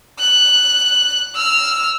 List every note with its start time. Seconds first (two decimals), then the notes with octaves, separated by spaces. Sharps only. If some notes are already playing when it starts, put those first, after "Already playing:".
0.19 F#6
1.36 E6 F6